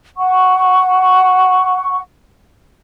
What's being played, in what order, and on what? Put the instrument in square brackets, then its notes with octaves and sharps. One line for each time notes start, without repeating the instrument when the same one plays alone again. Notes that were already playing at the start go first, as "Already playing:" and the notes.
[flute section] F#5 C#6